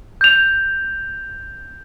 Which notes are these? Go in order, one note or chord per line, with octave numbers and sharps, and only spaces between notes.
G6 F7